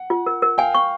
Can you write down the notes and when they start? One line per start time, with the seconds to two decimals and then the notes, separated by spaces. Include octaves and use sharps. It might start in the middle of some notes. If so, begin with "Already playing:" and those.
Already playing: F#5
0.10 F4
0.26 A#4
0.42 A#4
0.58 F5 G5 G#5
0.75 C#6